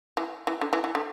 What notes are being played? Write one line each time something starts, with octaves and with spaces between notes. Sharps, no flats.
E3
E3
D3
E3
E3
D3